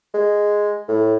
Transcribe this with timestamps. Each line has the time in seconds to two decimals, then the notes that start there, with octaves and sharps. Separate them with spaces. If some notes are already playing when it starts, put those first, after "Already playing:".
0.14 G#3
0.88 A2